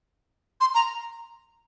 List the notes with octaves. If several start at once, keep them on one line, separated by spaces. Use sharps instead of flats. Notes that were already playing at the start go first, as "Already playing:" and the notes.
C6
A#5